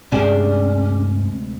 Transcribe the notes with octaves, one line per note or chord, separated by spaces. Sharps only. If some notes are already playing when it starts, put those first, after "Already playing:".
D2 G2 C3 G#3 C#4 D4 G4 G#4